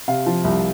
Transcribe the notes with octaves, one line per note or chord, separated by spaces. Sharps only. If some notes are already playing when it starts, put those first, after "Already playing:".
C3 F5
F3
C2